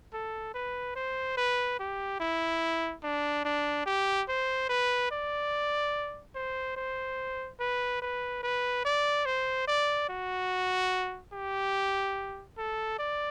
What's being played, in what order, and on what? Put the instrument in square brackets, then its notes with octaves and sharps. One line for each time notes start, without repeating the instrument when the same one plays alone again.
[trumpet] A4
B4
C5
B4
G4
E4
D4
D4
G4
C5
B4
D5
C5
C5
B4
B4
B4
D5
C5
D5
F#4
G4
A4
D5